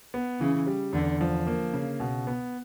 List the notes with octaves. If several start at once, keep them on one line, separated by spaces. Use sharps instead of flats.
B3
C#3 E3
G3
E2 D3
F3
A#3
C#3
B2
B3